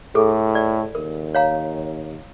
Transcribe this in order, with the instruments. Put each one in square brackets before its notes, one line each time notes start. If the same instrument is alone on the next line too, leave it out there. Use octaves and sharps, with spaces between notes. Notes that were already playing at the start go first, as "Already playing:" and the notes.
[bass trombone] A2 [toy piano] G#4 A4
[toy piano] D5
[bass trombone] D#2 [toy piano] A#4
[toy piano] C#5 F5 A#5